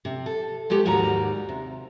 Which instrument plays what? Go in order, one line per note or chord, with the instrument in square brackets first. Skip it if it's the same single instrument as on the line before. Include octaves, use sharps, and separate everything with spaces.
[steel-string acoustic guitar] C3
A4
G#3 A3 B3 G4
D#2 G#2 G3 F#4 A#5
C3